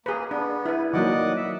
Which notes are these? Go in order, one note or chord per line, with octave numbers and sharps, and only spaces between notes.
A#3 G#4 B4
B3 D4
E4 B4
D#3 F#3 A#3 D5 D#5 F#5
E5